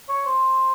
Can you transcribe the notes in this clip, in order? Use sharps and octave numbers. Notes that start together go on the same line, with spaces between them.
C#5
C5